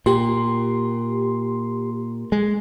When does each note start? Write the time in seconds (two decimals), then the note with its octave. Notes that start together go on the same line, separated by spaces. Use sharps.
0.06 A#2 G4 C6
2.32 G#3